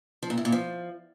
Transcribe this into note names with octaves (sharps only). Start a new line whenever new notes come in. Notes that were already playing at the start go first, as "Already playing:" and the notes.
F3
A#2
A2
A#2
F3